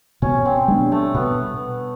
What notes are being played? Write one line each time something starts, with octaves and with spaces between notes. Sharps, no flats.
B2 C#4
C4
G3 B3 D4
A3
B2 B3